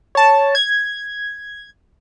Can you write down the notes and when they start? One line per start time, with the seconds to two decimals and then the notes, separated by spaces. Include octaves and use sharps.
0.15 C#5 A5
0.55 G#6